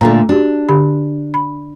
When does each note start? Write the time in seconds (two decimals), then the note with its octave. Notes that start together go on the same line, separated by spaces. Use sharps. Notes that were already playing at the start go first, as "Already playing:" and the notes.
0.01 A#2 D3 A3 A#5
0.29 D4 F#4 G4
0.69 D3 G4 B5
1.34 B5